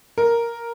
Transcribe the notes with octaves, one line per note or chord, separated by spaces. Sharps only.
A#4